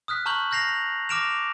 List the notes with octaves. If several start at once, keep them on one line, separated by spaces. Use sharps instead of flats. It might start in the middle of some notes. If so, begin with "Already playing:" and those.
D#6 F6 F#6 B6
A5 A#5 C#6 F6 G6 F#7
F6 G6 A#6 C7 F7
D6 F6 A#6 D7 E7 F7